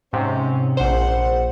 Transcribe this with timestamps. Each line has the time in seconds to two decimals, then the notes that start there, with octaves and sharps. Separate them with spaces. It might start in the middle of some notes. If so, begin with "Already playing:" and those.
0.13 G#2 C3 C#4
0.77 A#1 C5 F#5